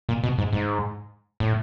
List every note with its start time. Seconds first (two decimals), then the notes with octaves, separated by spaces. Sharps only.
0.09 A#2
0.24 B2
0.38 G#2
0.53 G#2
1.40 A2